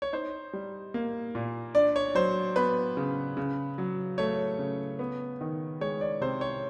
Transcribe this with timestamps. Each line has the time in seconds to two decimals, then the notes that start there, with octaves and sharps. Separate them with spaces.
0.02 C#5
0.13 D#4 C5
0.53 G3
0.94 A#3
1.35 A#2
1.75 D4 D5
1.96 C#5
2.15 F#3 C5
2.56 B3 B4
2.97 C#3
3.37 C#3
3.78 F#3
4.18 A3 C#5
4.59 C#3
4.99 B3
5.41 D#3
5.81 G#3 C#5
6.01 D5
6.21 C3 C5
6.41 C#5